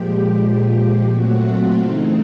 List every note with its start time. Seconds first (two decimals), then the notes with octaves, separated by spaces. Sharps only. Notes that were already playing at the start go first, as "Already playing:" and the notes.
Already playing: A#2 F3 G#3 G4
0.41 A#2 F3 G#3
1.09 A#2 F#3 A3 C4 F#4
1.44 F4
1.78 C#3 E3 A3 C4 D#4